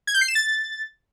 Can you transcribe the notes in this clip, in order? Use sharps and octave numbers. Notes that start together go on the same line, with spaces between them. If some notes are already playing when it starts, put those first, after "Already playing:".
G#6
G6
C7
E7
A6